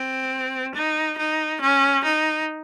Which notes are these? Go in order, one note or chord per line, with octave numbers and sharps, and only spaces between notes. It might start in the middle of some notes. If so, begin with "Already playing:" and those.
Already playing: C4
D#4
D#4
C#4
D#4